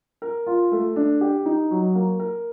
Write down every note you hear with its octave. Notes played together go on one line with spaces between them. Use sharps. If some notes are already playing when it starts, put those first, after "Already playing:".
A#4
F4
A3
D4
G4
D#4
F#3
A#3
A#4